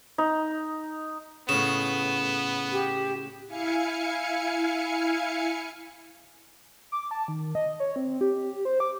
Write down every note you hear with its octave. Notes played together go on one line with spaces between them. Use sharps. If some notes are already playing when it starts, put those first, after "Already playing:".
D#4
A2 C#3 B3 E7
G4
E4 F5 G#5 C#7
D6
A5
D#3
D#5
C#5
C4
G4
C5
D6